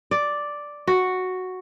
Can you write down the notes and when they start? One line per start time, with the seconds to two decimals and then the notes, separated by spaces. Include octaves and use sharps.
0.11 D5
0.87 F#4